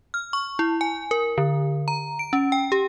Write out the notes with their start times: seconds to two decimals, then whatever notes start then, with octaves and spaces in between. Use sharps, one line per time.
0.14 F6
0.33 C#6
0.59 E4
0.81 G#5
1.11 A#4
1.38 D3
1.88 A#5
2.19 D7
2.33 C#4
2.52 G5
2.72 G4